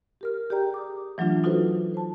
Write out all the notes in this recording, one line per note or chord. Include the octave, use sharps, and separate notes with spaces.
G4 A#4 F6
G4 G#4 D5 G5 A#5 G6
D6 D#6
E3 F#3 A3 D4 F4
D#4 F4 F#4 A4 B4 C5
C5 A5